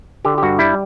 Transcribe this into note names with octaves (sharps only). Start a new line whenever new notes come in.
D3 G4
G4
G2 F#4
G3 E4